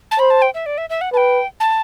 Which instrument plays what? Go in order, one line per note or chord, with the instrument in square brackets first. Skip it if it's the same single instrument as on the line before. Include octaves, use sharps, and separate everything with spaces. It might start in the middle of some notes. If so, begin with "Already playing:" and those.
[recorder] A5
[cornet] C5 [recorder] B5
[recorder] A5
G5
E5
D5
E5
E5
F#5
[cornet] B4 [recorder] A5
[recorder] G5
A5